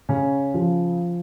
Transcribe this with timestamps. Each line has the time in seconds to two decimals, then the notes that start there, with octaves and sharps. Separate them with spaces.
0.09 C#3 C#4
0.54 F3